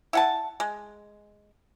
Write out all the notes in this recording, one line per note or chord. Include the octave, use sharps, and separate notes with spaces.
E4 F#5 A5
G#3